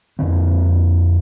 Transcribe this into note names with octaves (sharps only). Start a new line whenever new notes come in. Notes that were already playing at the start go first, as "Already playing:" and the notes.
F2 D3 C4